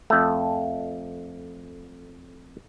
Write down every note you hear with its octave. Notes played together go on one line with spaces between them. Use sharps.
F2 A3